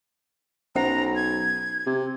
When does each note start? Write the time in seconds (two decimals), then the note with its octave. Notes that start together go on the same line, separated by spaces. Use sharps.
0.75 B1 C#4 C5 F#5 A#5
1.16 G#6
1.86 C3